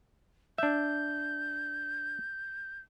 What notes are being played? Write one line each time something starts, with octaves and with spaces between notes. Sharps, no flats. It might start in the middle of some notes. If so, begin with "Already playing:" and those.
D4 E5 G6